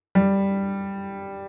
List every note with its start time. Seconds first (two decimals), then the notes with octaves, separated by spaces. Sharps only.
0.15 G3